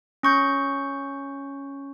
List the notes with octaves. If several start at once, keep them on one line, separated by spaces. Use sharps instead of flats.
C#4 C#6 G6